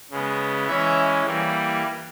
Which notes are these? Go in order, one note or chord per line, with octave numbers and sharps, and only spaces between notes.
C#3 G#3 B3
E3 G#3 C#4 C#5 E5
E3 G3 A#3